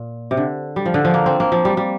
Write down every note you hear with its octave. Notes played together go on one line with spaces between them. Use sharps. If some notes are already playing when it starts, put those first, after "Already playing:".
Already playing: A#2
C3
D3
G3
F3
D3
F3
A#3
C4
A#3
F3
G3
G3